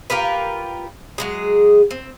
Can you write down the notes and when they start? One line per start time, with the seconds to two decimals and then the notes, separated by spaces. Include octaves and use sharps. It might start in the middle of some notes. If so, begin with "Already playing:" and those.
0.10 F4 G4 A#4 B4
1.18 F#3 G#3 G#4
1.91 C4